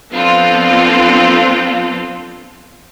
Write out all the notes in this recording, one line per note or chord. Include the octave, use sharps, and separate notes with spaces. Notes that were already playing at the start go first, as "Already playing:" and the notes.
F3 B3 C4 D4 F4 A4